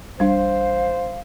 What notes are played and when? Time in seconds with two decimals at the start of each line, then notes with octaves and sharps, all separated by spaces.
0.20 A1 G3 D4 C5 F5